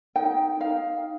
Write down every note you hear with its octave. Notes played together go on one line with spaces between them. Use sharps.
D#4 G5
D#4 F5